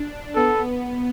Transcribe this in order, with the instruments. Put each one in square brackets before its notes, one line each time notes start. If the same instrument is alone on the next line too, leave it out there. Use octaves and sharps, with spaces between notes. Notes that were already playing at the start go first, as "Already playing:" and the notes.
Already playing: [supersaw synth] D4
[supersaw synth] B3 [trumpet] A4